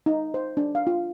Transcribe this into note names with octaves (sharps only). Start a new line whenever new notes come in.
D#4
C5
D4
F5
F4